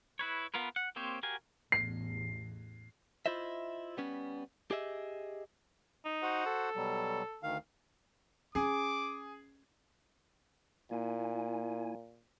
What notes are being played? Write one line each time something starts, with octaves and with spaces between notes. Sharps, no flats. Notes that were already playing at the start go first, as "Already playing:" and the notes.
E4 B4 C#5
B3 F4 A#4 B4
F#5
A#3 C4 G4 C5 C#5
F#4 G4 A#4 F5 G#5
A1 E2 C7
E4 F4 C5 D#5 E5
G3 B3 C#4
G4 G#4 D#5 E5
D#4
F#4 C5 F#5
A4
B2 F#3 G3
D2 D#3 F5
C#4 G#4 D6
A#2 A#3 E4 G#5